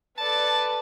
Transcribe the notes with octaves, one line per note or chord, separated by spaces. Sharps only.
A4 B4 D5 A5